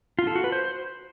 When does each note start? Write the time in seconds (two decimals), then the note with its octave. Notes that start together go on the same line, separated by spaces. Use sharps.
0.19 F4
0.27 A4
0.35 F#4
0.44 B4
0.52 C5